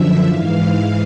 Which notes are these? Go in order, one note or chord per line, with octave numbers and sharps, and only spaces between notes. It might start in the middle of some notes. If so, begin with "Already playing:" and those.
Already playing: F#2 D3 F3 E5
G#2 E3 F5